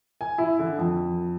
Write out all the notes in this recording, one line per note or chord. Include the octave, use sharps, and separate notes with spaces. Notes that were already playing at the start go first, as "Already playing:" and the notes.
G#5
E4
D3
F2